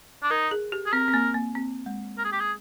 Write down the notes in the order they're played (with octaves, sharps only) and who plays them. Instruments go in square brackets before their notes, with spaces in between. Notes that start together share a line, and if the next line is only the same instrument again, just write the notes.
[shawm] D4
[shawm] D#4 [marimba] A#4
[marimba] G#4
G4
[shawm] G#4
[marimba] C4 [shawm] A#4
[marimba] C4
A#3
A#3
C4
G#3
[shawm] A#4
G#4
G4
G#4